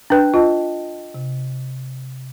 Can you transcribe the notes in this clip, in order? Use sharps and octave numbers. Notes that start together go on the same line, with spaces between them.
D4 B4 G5 F#6
F4 D#5 A5
C3